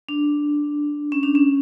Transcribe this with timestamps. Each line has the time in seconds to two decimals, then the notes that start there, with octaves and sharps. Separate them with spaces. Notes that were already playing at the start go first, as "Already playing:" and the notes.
0.09 D4
1.12 C#4
1.23 D4
1.35 C#4